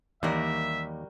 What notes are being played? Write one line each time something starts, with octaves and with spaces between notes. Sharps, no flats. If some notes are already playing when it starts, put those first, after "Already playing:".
D#2 E3 G3 A#3 F#4 A#4 E5